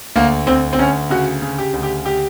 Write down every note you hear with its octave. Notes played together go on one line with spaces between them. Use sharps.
D2 A#3
D2 C4
C4
D2 C#4
C#3 F#4
C#3
G4
D2
G4
G4